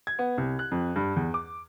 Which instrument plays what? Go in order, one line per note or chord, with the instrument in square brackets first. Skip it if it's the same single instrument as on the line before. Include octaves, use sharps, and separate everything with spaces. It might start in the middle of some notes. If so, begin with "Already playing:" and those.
[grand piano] G#6
B3
C2
F#6
F2
G2
E2
D6